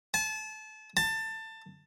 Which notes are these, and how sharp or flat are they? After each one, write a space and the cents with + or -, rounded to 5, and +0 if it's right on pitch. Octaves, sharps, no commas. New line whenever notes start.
A5 -30
A5 +20